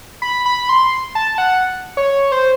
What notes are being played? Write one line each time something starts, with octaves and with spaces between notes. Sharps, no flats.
B5
B5
C6
A5
F#5
C#5
C5